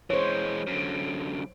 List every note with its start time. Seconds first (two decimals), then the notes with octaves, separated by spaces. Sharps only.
0.10 E3 G#3 C5 C#5
0.67 F#2 D3